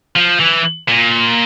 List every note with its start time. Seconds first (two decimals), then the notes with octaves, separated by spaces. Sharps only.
0.16 F3
0.40 E3
0.88 A#2